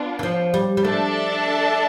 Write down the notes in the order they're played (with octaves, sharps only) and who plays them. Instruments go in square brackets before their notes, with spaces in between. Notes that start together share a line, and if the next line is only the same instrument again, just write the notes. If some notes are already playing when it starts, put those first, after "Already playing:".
Already playing: [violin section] B3 D4 F4
[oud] E3
F3
G3
G3
[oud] A3 [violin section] D4 A4 E5 A5